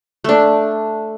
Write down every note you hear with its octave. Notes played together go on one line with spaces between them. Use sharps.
A3 D4